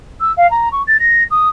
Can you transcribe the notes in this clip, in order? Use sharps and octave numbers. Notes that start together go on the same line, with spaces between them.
E6
F5
A#5
C#6
A6
A#6
D#6